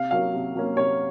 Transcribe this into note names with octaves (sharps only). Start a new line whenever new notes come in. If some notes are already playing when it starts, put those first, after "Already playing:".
Already playing: C3 F5
F#3 A#3 C#4 F5
C3
F#3 A#3 C#4
C3 C#5